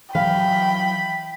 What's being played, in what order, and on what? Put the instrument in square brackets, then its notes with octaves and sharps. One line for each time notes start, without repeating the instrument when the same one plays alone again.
[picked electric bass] E3 F#3 [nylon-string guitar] F5 [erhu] G5 [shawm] B5